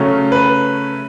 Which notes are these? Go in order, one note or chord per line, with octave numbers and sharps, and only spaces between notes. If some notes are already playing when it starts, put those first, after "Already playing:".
Already playing: C#3 F#3 A3 C#4
B4